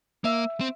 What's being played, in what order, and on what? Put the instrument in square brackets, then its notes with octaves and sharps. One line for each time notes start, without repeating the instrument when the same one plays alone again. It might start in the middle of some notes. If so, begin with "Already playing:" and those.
[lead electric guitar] A#3 [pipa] E5
[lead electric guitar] C4